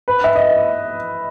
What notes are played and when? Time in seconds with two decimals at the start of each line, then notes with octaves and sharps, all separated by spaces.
0.08 B4
0.24 E5
0.36 D#5